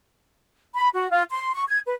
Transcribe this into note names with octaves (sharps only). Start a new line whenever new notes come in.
B5
F#4
F4
C6
C#6
G#6
B4